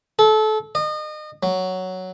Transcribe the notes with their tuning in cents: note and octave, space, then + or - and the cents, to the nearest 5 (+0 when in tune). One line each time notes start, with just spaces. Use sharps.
A4 -25
D#5 -30
F#3 +5